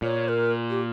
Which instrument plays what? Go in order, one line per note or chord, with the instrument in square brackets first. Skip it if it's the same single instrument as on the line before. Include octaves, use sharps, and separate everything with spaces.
[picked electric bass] A#2 [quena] C#5
[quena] A#4
G4